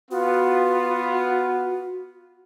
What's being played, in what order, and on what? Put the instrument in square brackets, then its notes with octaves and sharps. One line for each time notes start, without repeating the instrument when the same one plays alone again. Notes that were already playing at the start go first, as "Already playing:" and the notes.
[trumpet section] B3 F4 [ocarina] F#4